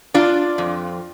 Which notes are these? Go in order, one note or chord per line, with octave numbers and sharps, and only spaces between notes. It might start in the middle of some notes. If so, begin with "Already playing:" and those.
D4 F4 D5
F2